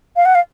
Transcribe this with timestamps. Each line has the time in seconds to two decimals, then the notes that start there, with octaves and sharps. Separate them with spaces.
0.16 F5
0.25 F#5
0.35 F5